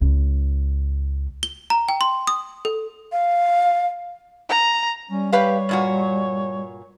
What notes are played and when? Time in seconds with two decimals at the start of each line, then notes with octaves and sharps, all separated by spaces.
0.01 C#2
1.43 G7
1.70 A#5
1.89 G5
2.01 C6
2.27 D#6
2.65 A4
3.12 F5
4.49 A#5
5.10 G3 C#4
5.33 G4 B4 C#5 F5
5.69 G2 A#2 F#4